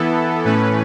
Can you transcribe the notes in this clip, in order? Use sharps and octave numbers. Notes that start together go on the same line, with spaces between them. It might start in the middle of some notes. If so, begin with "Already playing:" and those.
Already playing: E3 B3 E4 A4
A2 E3 A3 C#4 B4